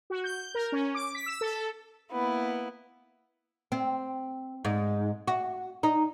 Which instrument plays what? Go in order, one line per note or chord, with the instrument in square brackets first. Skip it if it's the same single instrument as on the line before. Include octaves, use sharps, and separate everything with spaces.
[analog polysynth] F#4
G6
A#4
C#4
D6
B6
E6
A4
[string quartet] A#3 B3 E4
[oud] C4
G#2
F#4
D#4